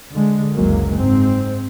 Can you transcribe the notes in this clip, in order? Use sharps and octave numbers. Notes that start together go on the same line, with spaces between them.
D3 G#3
F#1 C#2 F#3 G#3 A#3
G#2 C4